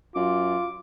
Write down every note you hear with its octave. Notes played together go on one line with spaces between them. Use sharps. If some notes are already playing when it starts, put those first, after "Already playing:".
F#2 F4 D6